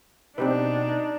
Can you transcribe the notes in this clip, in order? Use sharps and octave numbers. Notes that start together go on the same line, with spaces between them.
B2 C4 D4 D#4 G4 B4